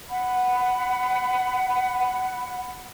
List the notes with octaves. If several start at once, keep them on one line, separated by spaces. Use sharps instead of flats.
F#5 B5